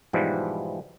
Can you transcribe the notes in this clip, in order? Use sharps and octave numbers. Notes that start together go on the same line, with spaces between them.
G#2 B2 E3 F3 G3